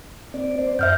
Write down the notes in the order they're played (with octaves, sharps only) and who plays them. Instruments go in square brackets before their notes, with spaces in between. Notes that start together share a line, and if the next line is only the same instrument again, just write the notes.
[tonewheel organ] C4 D5
C5 D5
[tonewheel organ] F#2 F#5 [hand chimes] E5 F6 G6